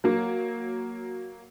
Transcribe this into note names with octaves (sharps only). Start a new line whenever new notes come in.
F#3 A#3